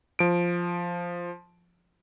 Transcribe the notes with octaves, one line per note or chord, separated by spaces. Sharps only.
F3 D7